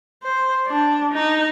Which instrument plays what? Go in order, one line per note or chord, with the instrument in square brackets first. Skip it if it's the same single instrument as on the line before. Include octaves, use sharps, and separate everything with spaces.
[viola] C5
D4
D#4